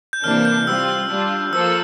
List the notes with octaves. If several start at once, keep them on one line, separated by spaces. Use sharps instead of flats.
G6
C3 E3 A#3 D4 F6
G6
G3 C4 F4 E6
G3 D4 F4
F3 A#3 A4 E6